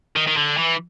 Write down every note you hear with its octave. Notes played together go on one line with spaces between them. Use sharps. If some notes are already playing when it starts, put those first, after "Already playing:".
D#3
D#3
D3
E3